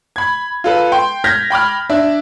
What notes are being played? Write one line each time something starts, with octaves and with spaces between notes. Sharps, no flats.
B5 G#6
F4 A4 B4
G5 C6
F6 G6 G#6 A#6 B6
G5 B5 D6 F6
D4 D5 E5